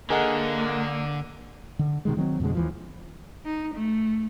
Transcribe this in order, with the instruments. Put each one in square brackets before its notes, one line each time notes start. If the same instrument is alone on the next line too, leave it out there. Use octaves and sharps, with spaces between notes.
[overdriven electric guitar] D3 [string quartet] A#3 [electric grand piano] G#4 [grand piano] A#4 D#5 F#5
[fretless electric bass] D3
B2 D#3 G#3
D#3 F#3 B3 C4
F2 B2 D3 G#3
D#2 E3 F3
[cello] D#4
A3